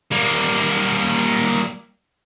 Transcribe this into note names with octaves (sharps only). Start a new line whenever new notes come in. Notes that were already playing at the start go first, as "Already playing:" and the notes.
G3 A#3